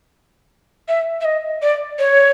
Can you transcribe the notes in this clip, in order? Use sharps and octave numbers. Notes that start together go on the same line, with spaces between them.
E5
E5
D#5
D5
C#5